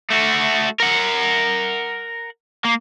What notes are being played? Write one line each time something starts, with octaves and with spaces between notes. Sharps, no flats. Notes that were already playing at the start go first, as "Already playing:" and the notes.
A3 F#4
A#4 F#5
A#3